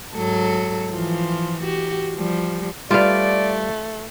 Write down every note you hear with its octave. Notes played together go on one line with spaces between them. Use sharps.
G#2 F#3 A4
E3 F3 F4
F#4 G4
F3 G3
G3 A3 F4 B4 D5 F5